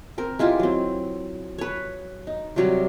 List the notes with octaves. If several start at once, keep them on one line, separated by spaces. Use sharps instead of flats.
C4 A#4
G#3 E4 F4 G4
F#3 C4
B4 C#5
D#4
C3 F#3 G3